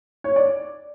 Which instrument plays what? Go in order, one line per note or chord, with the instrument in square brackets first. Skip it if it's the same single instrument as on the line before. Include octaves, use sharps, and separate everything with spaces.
[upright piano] C#5
D5